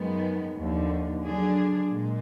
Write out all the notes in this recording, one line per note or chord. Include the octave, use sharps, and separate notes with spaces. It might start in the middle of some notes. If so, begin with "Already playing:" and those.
Already playing: F#2 D#3 G#3 B3
D#2 D3 F3
D3 F#3 D4 G#4
A#2 G#3